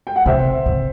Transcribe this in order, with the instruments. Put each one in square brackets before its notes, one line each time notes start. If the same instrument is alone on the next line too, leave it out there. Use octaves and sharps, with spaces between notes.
[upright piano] G5
F#5
[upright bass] C3 [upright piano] C5 E5
[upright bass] C3